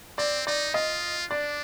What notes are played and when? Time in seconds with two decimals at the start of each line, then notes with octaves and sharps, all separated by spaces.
0.18 C4 D5
0.47 D#4 D5
0.74 F4 D#5
1.30 D4 D5